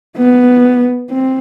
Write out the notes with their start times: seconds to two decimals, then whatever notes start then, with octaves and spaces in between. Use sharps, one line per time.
0.17 B3
1.10 C4